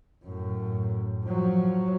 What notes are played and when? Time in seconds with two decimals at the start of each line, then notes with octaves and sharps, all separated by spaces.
0.23 F#2 A2
1.24 F3 F#3